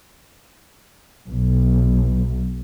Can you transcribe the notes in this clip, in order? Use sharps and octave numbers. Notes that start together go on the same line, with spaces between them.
B1